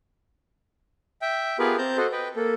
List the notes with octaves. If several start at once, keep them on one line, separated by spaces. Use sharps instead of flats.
E5 G5
B3 F4 G4 G#4 A#4 B4
C4 A5 A#5 G6
F#4 A4 C5 D#5
B4 D#5 G5
A#3 A4